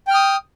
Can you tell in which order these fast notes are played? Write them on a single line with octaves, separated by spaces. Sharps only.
G5 F6 D#6